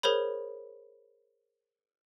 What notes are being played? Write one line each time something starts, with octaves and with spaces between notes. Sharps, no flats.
G#4 A#4 C5 C#5 B5